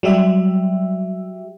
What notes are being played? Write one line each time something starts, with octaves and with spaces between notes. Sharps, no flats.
F#3 G3 G4 E5